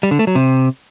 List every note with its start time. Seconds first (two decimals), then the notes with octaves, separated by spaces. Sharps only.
0.03 G3
0.11 D3
0.19 A3
0.27 F#3
0.35 C3